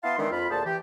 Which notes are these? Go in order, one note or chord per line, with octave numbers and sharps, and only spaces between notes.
B3 E4 F5 A5 C6
D#3 E3 G#3 B3 C4 D4
F2 F4 B5
D2 A#2 G#4 C5 A5
E3 G4